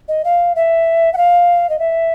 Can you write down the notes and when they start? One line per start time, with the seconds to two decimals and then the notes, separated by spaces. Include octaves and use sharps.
0.08 D#5
0.25 F5
0.56 E5
1.14 F#5
1.17 F5
1.70 D#5
1.79 E5